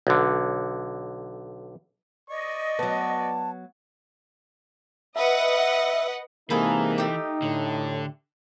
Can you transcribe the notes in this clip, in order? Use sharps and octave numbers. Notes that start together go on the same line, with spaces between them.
B1 D3
D5 D#5 C#6
F#3 B3 A5
B4 D#5 E5 F#5
C3 E3 G#3 A#3 D#4 G#4 A4 B4
A3 G4
A2 D3